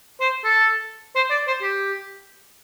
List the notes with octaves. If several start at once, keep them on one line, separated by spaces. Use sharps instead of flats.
C5
A4
C5
D5
C5
G4